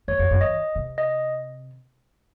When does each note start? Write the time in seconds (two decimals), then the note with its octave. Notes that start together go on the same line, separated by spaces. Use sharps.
0.08 F#2 C#5
0.19 F2
0.31 F#2
0.41 D#3 D#5
0.75 C3
0.98 D#5